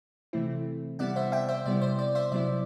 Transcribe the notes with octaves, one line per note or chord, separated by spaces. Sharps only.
C3 E3 A3 C4 E4
C3 G3 B3 E4 D5 F#5
C5 E5
E5 G5
C5 E5
C3 G3 B3 E4 D5
C5
D5
C5 E5
C3 F#3 B3 E4 D5